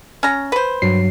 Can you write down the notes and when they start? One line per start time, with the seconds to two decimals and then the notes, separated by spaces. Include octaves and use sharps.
0.23 C#4 A#5
0.52 B4 C5
0.82 G2 F#3 C7